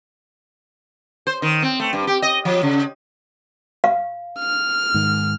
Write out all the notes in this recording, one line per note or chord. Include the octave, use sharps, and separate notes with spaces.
C5
D#3
C4
A3
G2
G4
D#5
F3
C#3
F5
F6
G#2 D#3